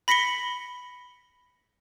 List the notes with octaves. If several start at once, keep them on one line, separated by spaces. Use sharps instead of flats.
B5 A#6 B6 C#7 G7